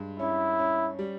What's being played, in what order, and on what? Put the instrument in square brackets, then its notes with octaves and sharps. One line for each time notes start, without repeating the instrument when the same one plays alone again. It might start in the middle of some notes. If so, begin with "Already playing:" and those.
Already playing: [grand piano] G2 G#3
[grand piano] C#4 [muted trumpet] E4
[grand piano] C#4
G3